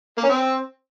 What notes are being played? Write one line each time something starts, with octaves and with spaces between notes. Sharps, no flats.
A#3
C#4
C4